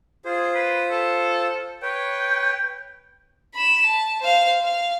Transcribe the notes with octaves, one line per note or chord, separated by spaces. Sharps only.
F4 G#4 C5
B4
A4
B4 C#5 G5
B5 E7
A5
C5 F5
F5